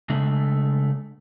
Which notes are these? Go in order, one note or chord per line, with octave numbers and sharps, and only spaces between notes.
C#3 G#3 A3 D4